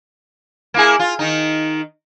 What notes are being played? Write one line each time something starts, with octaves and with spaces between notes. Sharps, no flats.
A#3 E4 G#4
F4
D#3 D#4